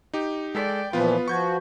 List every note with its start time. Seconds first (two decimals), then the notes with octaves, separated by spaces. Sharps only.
0.14 D#4 G4
0.55 G#3 A4 D5 G5 B6
0.93 A#2 E3 F3 B3 F4 B4
1.28 F3 F#4 C#6 G6 G#6